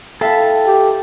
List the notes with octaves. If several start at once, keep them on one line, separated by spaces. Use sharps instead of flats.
E4 A4 E5 F5 G5 A5
G4